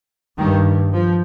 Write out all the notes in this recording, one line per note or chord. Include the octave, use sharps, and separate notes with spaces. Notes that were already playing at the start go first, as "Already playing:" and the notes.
G2 D#3
F3